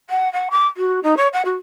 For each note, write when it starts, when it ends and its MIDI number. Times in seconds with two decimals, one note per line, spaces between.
0.09 0.31 78
0.33 0.48 78
0.50 0.66 86
0.77 0.99 66
1.03 1.14 63
1.16 1.27 73
1.33 1.42 78
1.45 1.56 66